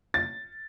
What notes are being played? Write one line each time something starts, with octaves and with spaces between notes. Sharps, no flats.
A6